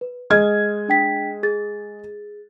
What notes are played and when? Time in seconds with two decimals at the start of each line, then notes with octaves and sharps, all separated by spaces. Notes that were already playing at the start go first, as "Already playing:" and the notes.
0.01 B4
0.30 G#3 D#5 F6 G#6
0.89 D4 G5 B6
1.43 G#4 A6